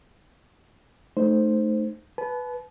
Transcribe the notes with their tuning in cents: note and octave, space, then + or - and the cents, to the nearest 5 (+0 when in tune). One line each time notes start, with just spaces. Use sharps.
A3 -10 D#4 -25 C5 +0
B4 +0 A5 -40